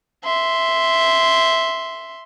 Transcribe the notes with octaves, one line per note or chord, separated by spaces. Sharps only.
E5 C6